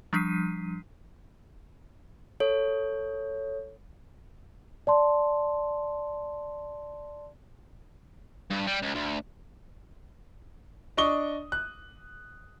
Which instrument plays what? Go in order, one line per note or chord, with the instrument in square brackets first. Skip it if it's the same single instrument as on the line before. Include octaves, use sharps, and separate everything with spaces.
[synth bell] F3 G3 D4 B6 C7 D#7
[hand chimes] A4 C#5
[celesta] D5 A5 C6
[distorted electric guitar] G2
G3
C#2
D2
[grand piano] D4 D#5 C#6 D#6 G7
F#6